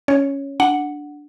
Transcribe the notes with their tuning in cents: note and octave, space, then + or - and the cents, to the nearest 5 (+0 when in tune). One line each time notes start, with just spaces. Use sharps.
C#4 +0 C#5 +0
D4 +0 F#5 +0